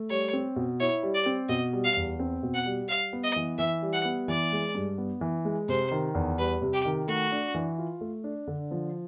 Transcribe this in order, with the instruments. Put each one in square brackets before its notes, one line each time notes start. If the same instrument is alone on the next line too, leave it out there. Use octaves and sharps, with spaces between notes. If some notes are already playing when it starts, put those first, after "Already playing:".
Already playing: [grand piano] A3
[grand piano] G3 [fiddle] C#5
[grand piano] C4
B2
[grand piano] E4 [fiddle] C#5
[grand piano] G3
[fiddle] D5
[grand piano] C4
[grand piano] B2 [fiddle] D#5
[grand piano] G3
[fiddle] F5
[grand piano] E2
C4
B2
[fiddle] F#5
[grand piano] G3
[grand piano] G3 [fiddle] F5
[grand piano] B3
[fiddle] D#5
[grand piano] E3
[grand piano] E3 [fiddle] E5
[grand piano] G3
[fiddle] F#5
[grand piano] B3
[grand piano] E3 [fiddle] D5
[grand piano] G#3
G2
B3
E3
G#3
[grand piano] C3 [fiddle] C5
[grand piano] D#3
E2
[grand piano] G3 [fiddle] B4
[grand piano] C3
[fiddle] G4
[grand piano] D#3
[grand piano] A3 [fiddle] F#4
[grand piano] D4
E3
F4
A3
D4
D3
F3